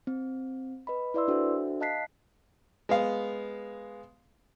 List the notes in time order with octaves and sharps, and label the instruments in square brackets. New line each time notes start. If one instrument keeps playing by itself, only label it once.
[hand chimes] C4
B4 D#5 B5
E4 B4 D5 E5 C6 E6
D4 F#4 A4 C5 E5
D#5 F5 A5 F#6 B6 C7
[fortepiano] G#3 B3 F5